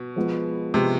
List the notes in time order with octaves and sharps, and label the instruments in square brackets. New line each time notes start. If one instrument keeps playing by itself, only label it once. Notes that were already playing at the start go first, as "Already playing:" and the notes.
Already playing: [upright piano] B2
[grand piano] F3 G#3 B3
[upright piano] C3 [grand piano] F3 G#3 B3